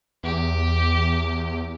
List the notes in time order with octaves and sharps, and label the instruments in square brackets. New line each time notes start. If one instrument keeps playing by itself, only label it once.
[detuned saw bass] E2 [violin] G4